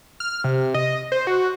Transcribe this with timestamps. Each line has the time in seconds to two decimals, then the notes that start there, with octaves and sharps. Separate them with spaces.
0.20 F6
0.44 C3
0.74 D#5
1.12 C5
1.27 F#4